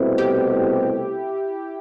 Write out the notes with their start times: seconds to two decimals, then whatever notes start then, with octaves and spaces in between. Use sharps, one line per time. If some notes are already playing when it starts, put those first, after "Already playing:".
Already playing: C2 B2 A3 C4 E4
0.18 G4